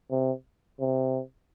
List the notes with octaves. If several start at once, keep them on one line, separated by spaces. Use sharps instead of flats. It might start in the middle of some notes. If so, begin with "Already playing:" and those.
C3
C3